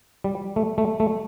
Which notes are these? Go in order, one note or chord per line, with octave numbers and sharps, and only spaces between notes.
G3
A3
A3
A3